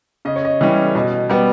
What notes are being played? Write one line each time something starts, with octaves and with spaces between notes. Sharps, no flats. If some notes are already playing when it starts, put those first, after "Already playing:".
C#3 D#5
C#5
D#5
E3 G3 C#4
B2
G3 B3